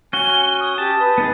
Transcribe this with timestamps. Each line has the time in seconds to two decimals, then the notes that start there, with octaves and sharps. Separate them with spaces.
0.13 C#4 F#4 G#5 G7
0.60 D#6
0.78 G4 A5
0.99 B4
1.18 B3 D#4 G#4 A6